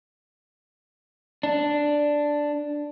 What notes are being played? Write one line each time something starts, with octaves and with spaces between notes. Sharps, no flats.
D4